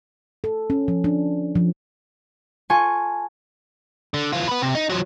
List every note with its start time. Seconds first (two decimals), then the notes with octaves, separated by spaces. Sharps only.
0.44 A4
0.70 C#4
0.88 F3
1.04 D4
1.55 F3
2.70 F4 A4 G#5 C#6
4.14 D3
4.33 E3 F4
4.48 B3 B4
4.62 C3
4.75 D#4
4.90 F3 F#3